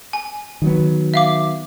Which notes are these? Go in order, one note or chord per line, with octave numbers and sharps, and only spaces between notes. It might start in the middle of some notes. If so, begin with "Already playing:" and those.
G#5
D#3 F#3 B3
E5 F5 D6